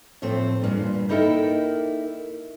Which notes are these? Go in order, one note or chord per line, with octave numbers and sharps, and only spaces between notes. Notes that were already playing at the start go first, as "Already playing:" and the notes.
A2 F3 A3 C4 C5
E2 G2 A#2
A#3 D#4 E4 A4 A#4 G5